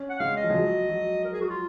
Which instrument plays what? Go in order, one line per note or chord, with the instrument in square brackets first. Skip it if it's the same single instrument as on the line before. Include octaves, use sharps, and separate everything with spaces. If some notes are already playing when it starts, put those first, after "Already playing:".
Already playing: [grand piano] C#4
[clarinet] F#5
[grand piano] G#3 [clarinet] F5
[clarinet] D#5
[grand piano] F3
G#3
F#3
F#3
[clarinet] A#4
G#4
F#4
F4